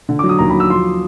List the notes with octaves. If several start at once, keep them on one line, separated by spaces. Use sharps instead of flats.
D3
F#3 D6
D#6
D#2 A#5
F#3 B5
E6
F3 C6